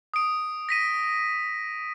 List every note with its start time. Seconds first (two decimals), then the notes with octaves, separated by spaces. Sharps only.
0.14 D#6 D7
0.69 A#6 B6 D#7